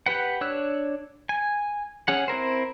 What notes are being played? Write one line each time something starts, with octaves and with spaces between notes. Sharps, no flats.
G4 B4 F#5
D4 C#5 E6 F#6
G#5
C#4 G#4 F#5
C4 E4 A#4 C5